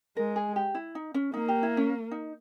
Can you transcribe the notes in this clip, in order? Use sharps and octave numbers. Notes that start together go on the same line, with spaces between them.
G#3 A#4
G#4
G4
E4
D#4
C#4
A#3 D#4
G4
E4
C#4
D#4